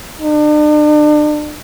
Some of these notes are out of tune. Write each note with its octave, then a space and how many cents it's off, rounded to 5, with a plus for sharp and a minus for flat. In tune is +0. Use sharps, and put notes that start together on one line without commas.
D4 +40